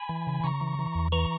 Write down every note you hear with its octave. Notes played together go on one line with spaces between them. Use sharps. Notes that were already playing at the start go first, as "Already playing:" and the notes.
Already playing: G#5 B5
E3
C#3
C#3 A#5 C#6
E3
E3
E2
E3 A#5 C#6